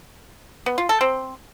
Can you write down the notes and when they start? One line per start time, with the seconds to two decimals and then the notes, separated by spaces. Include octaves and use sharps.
0.66 B3
0.78 F4
0.89 A4
1.01 C4